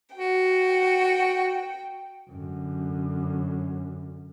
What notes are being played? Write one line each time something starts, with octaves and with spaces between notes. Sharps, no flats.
F#4 G5
F#2 D3